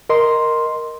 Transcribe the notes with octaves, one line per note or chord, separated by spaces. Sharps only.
A#4 D#5 C6